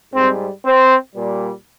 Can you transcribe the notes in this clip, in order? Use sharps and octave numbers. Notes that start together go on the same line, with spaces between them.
G#2 G3 C4
C4
A#2 G3